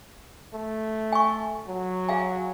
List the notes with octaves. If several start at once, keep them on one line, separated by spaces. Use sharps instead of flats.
A3
G#5 C#6
F#3
G#4 F5 G#5